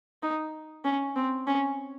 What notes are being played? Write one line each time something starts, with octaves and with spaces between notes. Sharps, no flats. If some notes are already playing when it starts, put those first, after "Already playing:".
D#4
C#4
C4
C#4